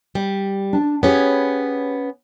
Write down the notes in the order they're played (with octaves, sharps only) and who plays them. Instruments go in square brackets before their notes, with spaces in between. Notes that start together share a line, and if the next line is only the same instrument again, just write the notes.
[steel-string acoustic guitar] G3
[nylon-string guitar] D4 A5
[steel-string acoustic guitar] B3 C#4 [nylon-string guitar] G4 G#4 C#5